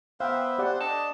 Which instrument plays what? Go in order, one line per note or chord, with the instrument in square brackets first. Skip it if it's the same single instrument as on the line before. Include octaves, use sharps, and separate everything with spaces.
[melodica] B3 B4 E5 [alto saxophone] C5 [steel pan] F5 G5
[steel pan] G4 D5 F#5
[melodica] D4 D#5 [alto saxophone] A5